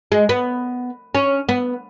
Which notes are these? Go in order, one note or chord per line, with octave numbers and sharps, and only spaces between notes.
G#3
B3
C#4
B3